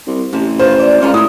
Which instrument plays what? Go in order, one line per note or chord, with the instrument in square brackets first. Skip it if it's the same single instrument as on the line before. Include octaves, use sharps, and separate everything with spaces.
[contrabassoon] C2
[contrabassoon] A1 [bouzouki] C3 A5
[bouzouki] D#3 F4 B4 [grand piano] C5
[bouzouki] D5
[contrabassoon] C#2 [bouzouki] C#4 F4 A#5
[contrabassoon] A2 [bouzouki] G#3 E4 [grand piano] D#6